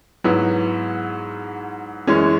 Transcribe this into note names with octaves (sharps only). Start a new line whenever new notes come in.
G#2 F#3 B3 E4 B4
F#2 E3 G#3 C#4